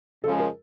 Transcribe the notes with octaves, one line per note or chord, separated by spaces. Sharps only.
C#3 F3 G#3 A4
A#4